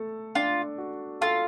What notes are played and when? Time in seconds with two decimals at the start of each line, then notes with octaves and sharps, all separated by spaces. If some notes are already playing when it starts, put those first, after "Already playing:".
Already playing: A3 A4
0.35 D4 F4
0.78 F#4
1.21 F4 A4